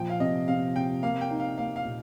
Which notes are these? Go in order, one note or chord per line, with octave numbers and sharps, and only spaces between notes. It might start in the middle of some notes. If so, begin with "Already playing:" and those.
Already playing: A#2 F3 G5
F5
C3 D#5
C3 F5
C3 G5
A#3 F5
G5
D#4
F5
A#3 F5
F5
A#2